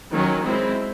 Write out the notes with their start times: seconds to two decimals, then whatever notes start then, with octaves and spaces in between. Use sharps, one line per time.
0.12 D#3 F#3 C#4
0.43 G#3 C4 E4